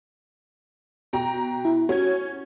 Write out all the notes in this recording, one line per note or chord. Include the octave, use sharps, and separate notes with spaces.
B2 G5 A#5
E4
C#4 F#4 C#5 G#6